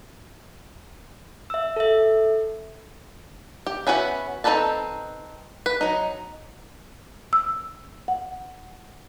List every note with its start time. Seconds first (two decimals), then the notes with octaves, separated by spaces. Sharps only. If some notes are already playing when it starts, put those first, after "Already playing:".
1.50 E5 E6
1.76 A4 E5
3.67 G4
3.87 B3 C#4 E4 F#4 B4
4.44 C4 D#4 A4 B4 A5
5.66 B4
5.81 F#3 D#4
7.33 E6
8.08 F#5